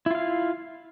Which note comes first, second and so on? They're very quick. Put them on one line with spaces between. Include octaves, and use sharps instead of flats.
E4 F4 F5